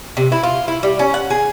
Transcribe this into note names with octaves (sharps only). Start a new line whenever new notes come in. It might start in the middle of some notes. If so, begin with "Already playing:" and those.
C3
E4
F4
E4
G3
C#4
F#5
G#4